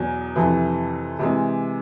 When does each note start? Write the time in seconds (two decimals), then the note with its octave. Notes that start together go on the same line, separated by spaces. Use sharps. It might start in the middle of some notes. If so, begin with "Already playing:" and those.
Already playing: E2 B2 F#3
0.36 F2 C3 E3
1.19 C3 E3 G#3